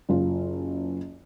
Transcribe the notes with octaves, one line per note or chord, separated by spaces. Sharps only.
F#1 F4